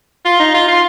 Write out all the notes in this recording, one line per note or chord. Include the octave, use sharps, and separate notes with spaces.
F4
D#4
F4
F4